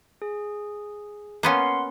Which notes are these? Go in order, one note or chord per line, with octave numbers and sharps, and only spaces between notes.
G#4
A#3 B3 C#4 F#5 C6 C7